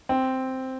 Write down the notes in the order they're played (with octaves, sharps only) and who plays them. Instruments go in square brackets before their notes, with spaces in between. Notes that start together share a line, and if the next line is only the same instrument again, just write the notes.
[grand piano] C4